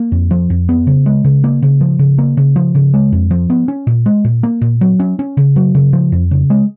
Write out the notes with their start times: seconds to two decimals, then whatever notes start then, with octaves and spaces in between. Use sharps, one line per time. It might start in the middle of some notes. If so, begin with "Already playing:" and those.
Already playing: A#3
0.12 F2
0.31 F3
0.50 F2
0.69 B3
0.87 C#3
1.06 G#3
1.25 C#3
1.44 A#3
1.62 C#3
1.81 F3
1.99 C#3
2.18 A#3
2.37 C#3
2.56 F3
2.75 C#3
2.94 G#3
3.12 F2
3.31 F3
3.50 B3
3.68 C#4
3.87 A#2
4.06 G#3
4.25 A#2
4.43 A#3
4.62 A#2
4.81 F#3
5.00 C#4
5.19 C#4
5.37 C#3
5.56 F#3
5.75 C#3
5.93 F3
6.12 F2
6.31 C#3
6.50 G#3